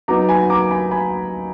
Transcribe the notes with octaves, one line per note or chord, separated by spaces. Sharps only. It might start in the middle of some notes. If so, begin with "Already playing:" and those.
F#3 B3 D#4 A#5 D6
G#5 B5
A#5 D6
G#5 B5
G#5 B5